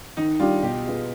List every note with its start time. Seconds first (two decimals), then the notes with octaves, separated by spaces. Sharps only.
0.17 D#3 D#4
0.39 G3 D4 F4 G4
0.63 B2 G4
0.85 B3 F4 G#4